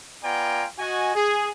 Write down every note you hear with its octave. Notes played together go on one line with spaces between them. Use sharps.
B3 F4 D5 G5 G#5 A#5
F#4 D#5 G#5
G#4